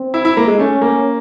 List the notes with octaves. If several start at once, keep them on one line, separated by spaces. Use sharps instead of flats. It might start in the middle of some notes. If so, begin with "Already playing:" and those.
Already playing: C4
E4
E4
A#3
G#3
A3 C#4
A#3